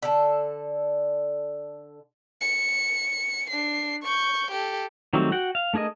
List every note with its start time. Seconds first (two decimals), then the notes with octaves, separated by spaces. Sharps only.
0.02 D3 A4
2.41 C#7
3.50 D4 C7
4.04 C#6 G6
4.51 G4 A4
5.13 D#3 F#3 G3 A3 C4
5.32 F#4 F#5 G5
5.55 F5
5.74 A3 D4 G#4 A#4 D#5